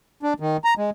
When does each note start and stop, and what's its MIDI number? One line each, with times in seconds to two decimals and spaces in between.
0.23 0.34 62
0.40 0.57 51
0.64 0.74 82
0.77 0.90 56